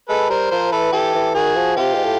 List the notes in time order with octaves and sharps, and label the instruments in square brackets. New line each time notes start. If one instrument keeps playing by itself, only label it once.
[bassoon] G#3 [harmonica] A4 B4
[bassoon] G3 [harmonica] A#4 C5
[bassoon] F3 [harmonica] A#4 C5
[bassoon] E3 [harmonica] A4 B4
[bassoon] E3 [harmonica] G4 A4
[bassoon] E3
[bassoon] D#3 [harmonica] F#4 G#4
[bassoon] F3
[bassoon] C3 [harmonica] F4 G4
[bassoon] G#2
A2